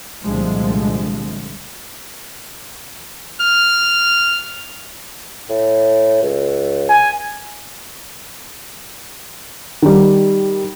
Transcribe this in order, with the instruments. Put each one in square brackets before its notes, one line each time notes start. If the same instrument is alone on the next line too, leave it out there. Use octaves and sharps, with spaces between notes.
[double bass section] C2 A#2 D3 F3 G#3 A3
[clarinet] F6
[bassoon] A2
C#2
[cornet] G#5
[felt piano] D#3 G3